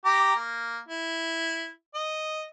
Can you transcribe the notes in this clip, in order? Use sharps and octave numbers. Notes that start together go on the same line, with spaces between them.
G4 A#5 D6
A#3
E4
D#5